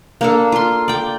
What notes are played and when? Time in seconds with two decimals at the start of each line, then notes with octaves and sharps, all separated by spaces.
0.21 A#3 D4 A4
0.52 F4 C6
0.88 D5 G5